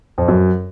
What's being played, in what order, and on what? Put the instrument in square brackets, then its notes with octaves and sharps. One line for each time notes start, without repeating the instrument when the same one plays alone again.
[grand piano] F2
F#2